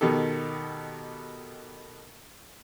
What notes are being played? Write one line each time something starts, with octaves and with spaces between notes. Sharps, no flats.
B2 D#3 G4 A4